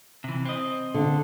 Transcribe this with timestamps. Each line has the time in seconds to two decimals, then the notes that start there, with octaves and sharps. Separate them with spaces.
0.24 C3 E3
0.45 C4 D#5
0.94 D3